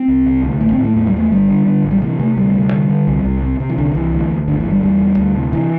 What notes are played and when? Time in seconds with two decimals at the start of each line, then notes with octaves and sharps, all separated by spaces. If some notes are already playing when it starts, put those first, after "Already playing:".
Already playing: C4
0.08 C2
0.26 C3
0.43 D2
0.61 A1 A3
0.72 C4
0.78 A2
0.84 A3
0.96 E2 A3
1.07 G3
1.14 E2 A3
1.31 G1 G3
1.48 D3
1.66 D3
1.84 A1
1.91 G3
2.02 C3 E3
2.19 C3 A3
2.36 D2 G3
2.54 C3
2.73 D3
2.89 D3
3.07 C2
3.24 C2
3.42 C3
3.60 C3
3.70 E3
3.78 C2 D3
3.95 C2 E3
4.12 D2
4.30 D2
4.48 G1 D3
4.60 E3
4.65 G1
4.71 G3
4.83 E2 G3
5.01 E1
5.19 D2
5.36 C3
5.53 C3 E3